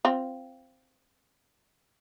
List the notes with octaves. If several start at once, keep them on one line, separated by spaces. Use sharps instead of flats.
C4 F4